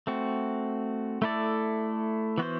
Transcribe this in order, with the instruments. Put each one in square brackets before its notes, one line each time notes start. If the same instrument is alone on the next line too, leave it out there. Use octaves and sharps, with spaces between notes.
[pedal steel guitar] A3 C4 F#4
A3 E4 A4 D5
E3 B3 F#4 C5